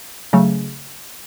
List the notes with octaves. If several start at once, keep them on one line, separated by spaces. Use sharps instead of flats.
C#3 F#3 A3